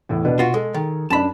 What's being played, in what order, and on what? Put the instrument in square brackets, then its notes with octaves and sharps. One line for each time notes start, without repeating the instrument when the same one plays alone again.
[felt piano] E2 A2
B2 D4 B4
[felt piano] B2 [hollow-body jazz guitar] F4 F#4
[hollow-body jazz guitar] G#3 [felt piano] G#4 A4
[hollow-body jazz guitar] D#3
[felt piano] F#2 D4 [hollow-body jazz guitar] A5 B5